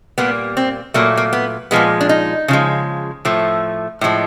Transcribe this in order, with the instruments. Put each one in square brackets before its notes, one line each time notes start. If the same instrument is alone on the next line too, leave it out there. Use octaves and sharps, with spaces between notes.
[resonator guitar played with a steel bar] A#2 G3 A#3 B3
C4
A#2 F#3 A3 A#3
A#3
B3
A#2 F3 G#3 B3
D4
D#4
C#3 F3 G#3
A2 F3 A3
A2 F3 G#3